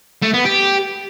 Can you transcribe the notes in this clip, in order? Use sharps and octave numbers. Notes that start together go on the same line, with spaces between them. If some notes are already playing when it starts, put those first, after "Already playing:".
A3
B3
G4